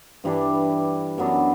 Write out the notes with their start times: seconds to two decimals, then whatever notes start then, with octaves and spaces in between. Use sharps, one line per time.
0.24 G2 E3 G3 D4
1.18 F#2 F#3 B3 D4